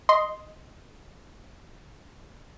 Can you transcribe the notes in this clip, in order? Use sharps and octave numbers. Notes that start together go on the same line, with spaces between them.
D#5 C6